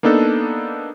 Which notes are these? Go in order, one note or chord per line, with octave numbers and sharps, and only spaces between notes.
A#3 B3 D4 D#4 A4